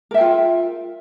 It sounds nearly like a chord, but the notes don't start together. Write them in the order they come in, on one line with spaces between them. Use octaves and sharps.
A#4 E5 G5 F4